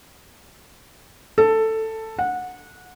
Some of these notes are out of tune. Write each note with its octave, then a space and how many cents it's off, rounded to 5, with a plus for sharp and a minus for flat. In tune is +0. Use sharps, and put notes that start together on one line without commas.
A4 +10
F#5 -20